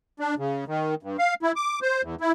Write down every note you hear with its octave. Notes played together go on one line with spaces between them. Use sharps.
D4
C#3
D#3
G2
F5
E4
D6
C5
E2
E4